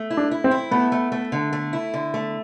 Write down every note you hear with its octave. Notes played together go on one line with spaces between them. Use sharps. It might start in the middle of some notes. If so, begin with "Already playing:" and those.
Already playing: A3
E4
D4
E4
C4
E4
A3 B3
A3
A3
D3
A3
E4
D3
A3